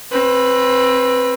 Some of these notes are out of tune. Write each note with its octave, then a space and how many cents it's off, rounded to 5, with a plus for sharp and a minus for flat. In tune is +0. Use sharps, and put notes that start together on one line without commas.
C4 +25 B4 +0